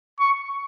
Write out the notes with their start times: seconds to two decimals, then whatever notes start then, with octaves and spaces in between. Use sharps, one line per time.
0.20 C#6